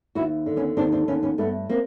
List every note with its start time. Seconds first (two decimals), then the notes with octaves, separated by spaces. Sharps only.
0.15 D#2 E4 F#4
0.46 D3
0.56 B3 C#4
0.77 D#2 C4 D4
0.92 C4 D4
1.08 D#2 B3 C#4
1.23 B3 C#4
1.38 G2 A3 B3
1.69 A#3 C4